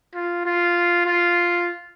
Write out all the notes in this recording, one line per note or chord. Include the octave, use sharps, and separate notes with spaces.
F4
F4
F4